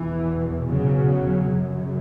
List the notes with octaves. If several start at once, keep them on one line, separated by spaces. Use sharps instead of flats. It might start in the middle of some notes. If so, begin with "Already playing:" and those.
Already playing: E2 B2 E3
C#3 F#3
F#2 C#3